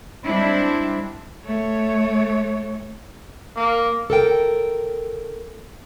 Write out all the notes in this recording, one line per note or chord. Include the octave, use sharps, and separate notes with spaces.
G3 G#3 C4 D4 E4
A3 C#5
A#3
A4 A#4 G5